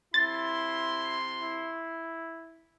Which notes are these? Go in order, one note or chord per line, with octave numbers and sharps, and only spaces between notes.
C3 E4 C6 A6
E4